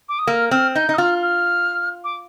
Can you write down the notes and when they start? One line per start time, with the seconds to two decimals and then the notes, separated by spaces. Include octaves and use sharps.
0.09 D6
0.19 D#6
0.27 A#3 F6
0.51 C4 F6
0.75 D#4 G6
0.89 D#4
0.94 D#6
0.98 F4 F6
1.22 F6
2.04 D6